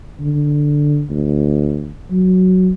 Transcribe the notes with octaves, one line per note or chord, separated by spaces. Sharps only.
D3
D2
F#3